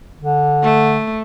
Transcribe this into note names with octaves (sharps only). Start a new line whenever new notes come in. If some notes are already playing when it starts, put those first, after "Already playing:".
D3
A3